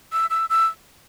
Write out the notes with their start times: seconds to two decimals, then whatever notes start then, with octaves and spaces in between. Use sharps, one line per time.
0.12 E6
0.30 E6
0.50 E6